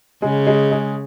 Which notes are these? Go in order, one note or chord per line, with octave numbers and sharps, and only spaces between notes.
C#3 G#3
G#3
G#3